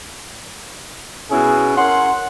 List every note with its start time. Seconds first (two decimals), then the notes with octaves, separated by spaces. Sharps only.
1.31 B2 B3 C#4 E4 G#4
1.77 C#4 A#4 F#5 C6